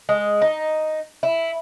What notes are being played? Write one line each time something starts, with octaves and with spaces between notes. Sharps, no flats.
G#3
D#4
E4